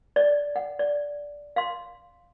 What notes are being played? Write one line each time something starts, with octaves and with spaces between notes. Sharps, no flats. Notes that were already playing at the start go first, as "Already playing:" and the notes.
D5 D#5
F#5
D5
F5 C6